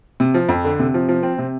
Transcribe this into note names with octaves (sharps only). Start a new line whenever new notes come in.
C3
F3
F2
D3
C3
F3
F3
C4
C3